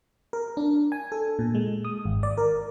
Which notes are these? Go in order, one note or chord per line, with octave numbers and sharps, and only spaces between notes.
A#4
D4
G#5
A4
A#2
G#3
D#6
G#1
D5
A#4